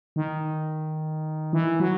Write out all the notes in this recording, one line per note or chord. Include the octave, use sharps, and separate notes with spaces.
D#3
E3
F#3